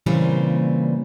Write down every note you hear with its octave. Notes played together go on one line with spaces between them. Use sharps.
A#2 C#3 E3 G3 A#3 C4